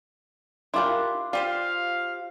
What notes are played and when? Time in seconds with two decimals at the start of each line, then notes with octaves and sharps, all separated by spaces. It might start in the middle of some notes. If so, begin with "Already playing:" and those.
0.74 D4 E4 F4 G4 A#4 C6 D6
1.33 F4 G4 C5 D5 F5